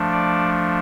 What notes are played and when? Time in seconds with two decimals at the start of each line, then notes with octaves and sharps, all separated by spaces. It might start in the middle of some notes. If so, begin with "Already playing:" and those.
Already playing: F3 A3 D4
0.12 D5